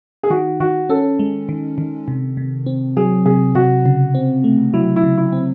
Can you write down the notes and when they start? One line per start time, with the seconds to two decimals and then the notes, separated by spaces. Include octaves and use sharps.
0.23 G#4
0.30 D#3 F#4
0.60 D#3 F#4
0.89 C#4 A4
1.19 G#3
1.49 D#3
1.78 D#3
2.08 C3
2.37 C3
2.66 C4
2.97 F#3 G#4
3.25 C3 G#4
3.55 C3 F#4
3.86 C#3
4.15 C4
4.44 A3
4.73 F#3 E4
4.96 E4
5.03 C#3
5.17 E4
5.33 C4